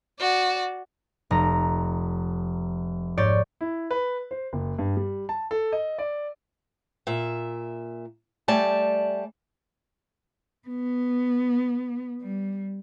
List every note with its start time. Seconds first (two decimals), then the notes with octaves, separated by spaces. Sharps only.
0.20 F#4 D5
1.31 F1 A#5
3.18 G#2 C#5 D5 G6
3.61 E4
3.91 B4
4.31 C5
4.53 F#1
4.79 G2
4.97 G3
5.29 A5
5.51 A4
5.72 D#5
5.98 D5
7.07 A#2 E5
8.48 G3 A3 D5 G#5 A5
10.68 B3
12.22 G3